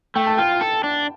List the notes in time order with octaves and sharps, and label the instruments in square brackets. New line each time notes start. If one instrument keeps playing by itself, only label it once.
[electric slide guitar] A3 [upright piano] G5
[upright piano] A5
[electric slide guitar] F4 [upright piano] G5
[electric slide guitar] A4
D4